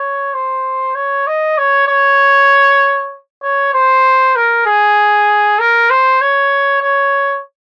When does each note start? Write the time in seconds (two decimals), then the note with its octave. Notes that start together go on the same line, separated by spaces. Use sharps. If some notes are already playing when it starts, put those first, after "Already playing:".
Already playing: C#5
0.34 C5
0.95 C#5
1.27 D#5
1.58 C#5
1.88 C#5
3.42 C#5
3.74 C5
4.36 A#4
4.66 G#4
5.59 A#4
5.90 C5
6.21 C#5
6.82 C#5